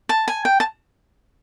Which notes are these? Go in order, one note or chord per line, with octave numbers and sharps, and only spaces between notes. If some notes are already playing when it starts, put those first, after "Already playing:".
A5
G#5
G5
A5